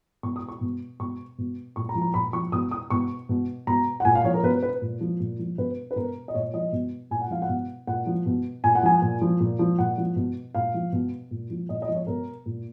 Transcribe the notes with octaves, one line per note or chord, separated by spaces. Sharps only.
B2 C#6
D#6
C#6
B2
B2 C#6
B2
A#2 C#6
A#5
F3
A#5
A#2 B5
F3 C#6
B2 D#6
D#6
B2 C#6
B2
B2 A#5
F#5
A#2 G#5
F5
F3 C#5
A#4
B2 B4
B4
A#2
F3
A#2
F3
B2 B4
B4
B2 A#4
D#5
A#2 C#5
F3 D#5
B2
A#2 G#5
F#5
F3 F5
F#5
B2
A#2 F#5
F3
B2
A#2 G#5
F#5
F3 G#5
A#2
F3
A#2
F3
A#2 F#5
F3
B2
A#2 F5
F3
B2
A#2
F3
A#2 D#5
D#5
F3
C#5
B2 A#4
A#2